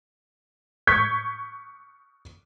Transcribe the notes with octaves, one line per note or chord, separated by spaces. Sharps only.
C#6 G6 G#6 B6